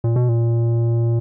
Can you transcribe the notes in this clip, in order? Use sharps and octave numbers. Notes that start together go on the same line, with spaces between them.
A#2
B2
A#2